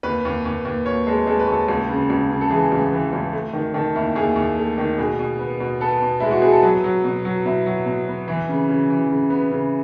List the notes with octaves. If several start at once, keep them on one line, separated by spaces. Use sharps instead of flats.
D#2 B4
D#2
D#2
D#2
D#2 C#5
G#3 A4
G#3 A4
B4
D#2 A4
C#2
C#3
C#2
C#3
A4
E3 G#4
C#2
E3
C#2
A3
D#3
D#3 A4
D#2 E4
D#2 G#4
D#2
A3
D#3
B2 G#4
B2
B3
B2
B3 A4
B2
G#3 E4
F#4
B3 G#4
A4
F#3 B4
F#3
B2
F#3
B2 E4
F#3
B2
B3
E3 E4
C#3
C#3
E3
C#3
B3
C#3